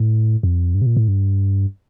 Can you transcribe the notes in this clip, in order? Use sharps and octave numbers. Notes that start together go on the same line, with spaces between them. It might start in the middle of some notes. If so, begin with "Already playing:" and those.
Already playing: A2
F2
G2
C3
A#2
A2
G2